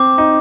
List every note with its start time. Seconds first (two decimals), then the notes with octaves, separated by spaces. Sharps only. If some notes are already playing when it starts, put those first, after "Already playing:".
Already playing: C4 D6
0.18 D#4